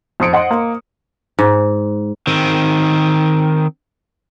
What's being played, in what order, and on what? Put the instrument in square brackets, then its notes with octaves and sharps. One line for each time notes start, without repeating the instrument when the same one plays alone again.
[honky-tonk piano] F2 C6 D#6 C#7 D7
D#5 F#5 C6
A#3
[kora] G#2
[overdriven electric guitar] D#3 C4